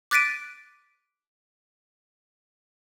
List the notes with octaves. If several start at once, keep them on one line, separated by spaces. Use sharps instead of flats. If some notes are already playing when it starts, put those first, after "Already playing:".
D6 F#6 A6 B6 D7 D#7